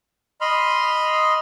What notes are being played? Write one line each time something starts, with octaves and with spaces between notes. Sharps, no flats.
D#5 B5 C6 F6